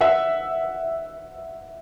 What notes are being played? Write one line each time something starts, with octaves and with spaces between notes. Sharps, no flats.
E5 F#5